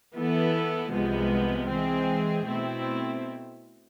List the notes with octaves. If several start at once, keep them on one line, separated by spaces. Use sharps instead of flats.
E3 B3 E4 A4
C2 C3 F3 G#3 B3
E3 G#3 C4 G#4
B2 A3 C4 E4